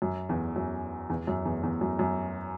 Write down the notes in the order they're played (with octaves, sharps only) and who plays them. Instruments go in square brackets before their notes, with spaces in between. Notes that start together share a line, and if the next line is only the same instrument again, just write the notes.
[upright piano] F#2
E2
F#2
E2
F#2
E2
E2
F#2
F#2